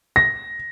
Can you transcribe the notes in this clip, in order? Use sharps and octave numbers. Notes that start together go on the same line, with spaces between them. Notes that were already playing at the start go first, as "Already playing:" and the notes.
A#6